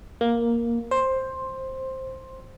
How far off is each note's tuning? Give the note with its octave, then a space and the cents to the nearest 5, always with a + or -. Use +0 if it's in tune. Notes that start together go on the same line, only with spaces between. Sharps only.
A#3 +5
C5 +10